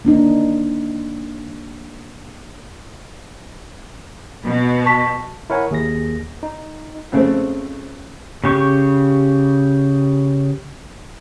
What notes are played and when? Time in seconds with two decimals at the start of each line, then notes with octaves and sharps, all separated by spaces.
0.05 A#3 D4 D#4
4.45 B2
4.86 A5 C#6 B6
5.50 E4 A#4 C#5 F#5 G#5
5.71 D#2 G#4 A#6
6.43 D#4
7.12 F2 C#3 A3 C4
8.44 C#3 G4 C#6